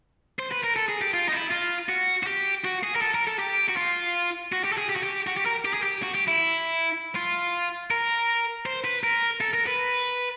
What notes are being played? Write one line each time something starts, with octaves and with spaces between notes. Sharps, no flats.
C5
B4
A#4
A4
G#4
G4
F4
D#4
E4
F4
F#4
F#4
G4
F#4
G#4
A#4
A4
A#4
A4
G4
F#4
F4
F#4
G4
A4
G#4
G4
F#4
G4
F#4
G4
A#4
G4
G#4
G4
F#4
G4
E4
F4
A#4
C5
B4
A#4
A4
A#4
B4